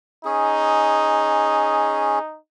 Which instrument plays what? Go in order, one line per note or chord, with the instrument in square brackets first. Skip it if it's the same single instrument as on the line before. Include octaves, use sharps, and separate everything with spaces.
[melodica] C#4 G#4 [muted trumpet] D#4